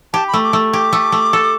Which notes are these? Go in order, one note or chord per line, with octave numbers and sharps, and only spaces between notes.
G4 A5
B5
A3
D6
A3
G4 D6
A3
A3
A4